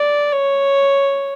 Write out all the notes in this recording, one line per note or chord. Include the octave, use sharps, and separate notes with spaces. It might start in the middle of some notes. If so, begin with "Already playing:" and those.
Already playing: D5
C#5